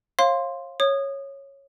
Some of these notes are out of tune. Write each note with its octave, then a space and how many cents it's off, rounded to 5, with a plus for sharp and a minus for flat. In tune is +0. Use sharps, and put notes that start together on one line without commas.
C#5 -40 F5 +0 C6 +0
C#5 -10 D#6 -20